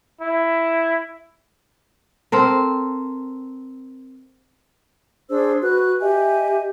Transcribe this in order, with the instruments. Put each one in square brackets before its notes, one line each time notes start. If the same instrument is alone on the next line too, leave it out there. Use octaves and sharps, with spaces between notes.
[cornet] E4
[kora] C4 A4 A#4
[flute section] D4 G#4 C5 E6
F#4 B4 F#6
G4 D#5 E5 G#5